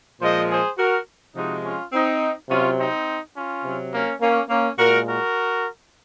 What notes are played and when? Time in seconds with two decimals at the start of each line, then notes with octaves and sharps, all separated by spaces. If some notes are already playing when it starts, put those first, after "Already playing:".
0.21 A#2 F3 G#3 C5 D#5
0.50 G#4 C5
0.79 F#4 A#4
1.35 C3 F3 G#3 D#4 F#4
1.64 C#4 F4
1.93 C4 D#4
2.50 C3 F#3 C#4 F4
2.78 C4 D#4
3.36 C#4 F4
3.65 C3 F#3
3.93 A#3 C#4
4.21 A#3 C#4
4.50 A#3 C#4
4.79 A#2 G#3 F#4 A#4
5.07 F#4 A#4